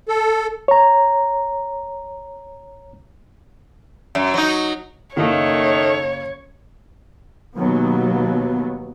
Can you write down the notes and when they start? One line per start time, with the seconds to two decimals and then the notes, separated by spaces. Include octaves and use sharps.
0.08 A4
0.68 C#5 A#5
4.15 F#2
4.34 F#3 D#4
5.17 F#1 D#3 A3 A#3 C#5
7.58 D#2 B2 F#3 B3